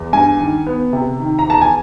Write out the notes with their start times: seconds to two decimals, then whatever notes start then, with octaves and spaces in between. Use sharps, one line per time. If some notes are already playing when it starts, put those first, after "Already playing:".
Already playing: E2
0.13 G2 G#5
0.40 D#3
0.67 B3
0.93 C3
1.20 D#3
1.39 A#5
1.47 E2 A5
1.61 G#5